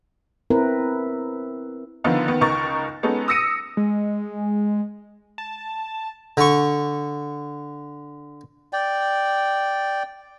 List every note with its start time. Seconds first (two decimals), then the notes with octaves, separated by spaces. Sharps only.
0.50 C4 E4 A#4 B4
2.04 D3 D#3 F3 B3 D#4 F4
2.28 D#3 B3
2.41 C#2 D#4 A#4 C#6 A6
3.03 G#3 B3 C#4 D#4 A4
3.28 D#6 E6 A#6 C#7 D#7
3.77 G#3
5.38 A5
6.37 D3 C#6
8.73 D5 G5